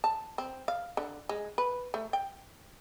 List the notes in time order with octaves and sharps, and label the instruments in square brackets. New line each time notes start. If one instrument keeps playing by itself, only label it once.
[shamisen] A5
C4
F5
D3
G#3
B4
A3
G5